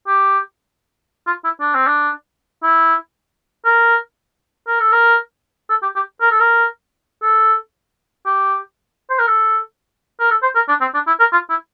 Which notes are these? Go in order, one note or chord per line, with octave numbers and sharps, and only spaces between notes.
G4
F4
E4
D4
C4
D4
E4
A#4
A#4
A4
A#4
A4
G4
G4
A#4
A4
A#4
A4
G4
C5
A#4
A4
A#4
A4
C5
A#4
D4
C4
D4
E4
A#4
F4
E4